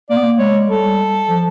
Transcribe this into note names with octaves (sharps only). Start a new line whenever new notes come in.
A#3 D5
B3
A#3
G#3 C#5
G3 A4
F3